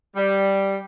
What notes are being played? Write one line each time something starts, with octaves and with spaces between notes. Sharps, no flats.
G3